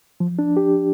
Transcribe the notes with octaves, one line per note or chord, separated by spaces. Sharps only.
F3
D4
G4